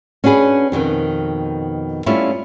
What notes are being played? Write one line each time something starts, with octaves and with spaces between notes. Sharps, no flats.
C#4 D4 F#4 G#4 B4
F2 B2 D3 D#3
G3 A3 B3 C#4 E4 F4